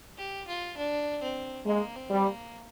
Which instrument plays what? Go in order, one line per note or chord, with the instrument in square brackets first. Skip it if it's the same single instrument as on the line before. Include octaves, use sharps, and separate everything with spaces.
[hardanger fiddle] G4
F4
D4
C4
[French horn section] G#3 [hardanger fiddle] A#3
[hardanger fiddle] C4
[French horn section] G3
[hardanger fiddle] A#3